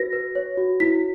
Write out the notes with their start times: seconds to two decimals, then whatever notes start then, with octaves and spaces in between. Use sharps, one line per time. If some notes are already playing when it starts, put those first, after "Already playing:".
Already playing: F#4 B4 A#6
0.13 B4
0.35 C#5
0.57 F#4
0.80 E4 B6